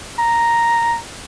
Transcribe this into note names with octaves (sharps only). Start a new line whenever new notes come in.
A#5